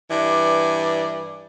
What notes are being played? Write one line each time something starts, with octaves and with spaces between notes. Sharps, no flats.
G2 E3 D5